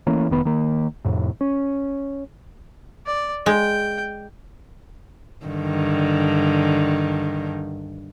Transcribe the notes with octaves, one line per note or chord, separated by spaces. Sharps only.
E3 A3 A#3 C#4
F1 D#3 B3
D#3 A#3
F2 A2 C3
C#4
D5
G#3 G5
G2 D3 D#3